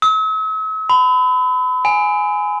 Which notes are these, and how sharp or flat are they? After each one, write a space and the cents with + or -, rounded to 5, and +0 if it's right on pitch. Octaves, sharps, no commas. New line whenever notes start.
E6 -45
B5 +35
G#5 +5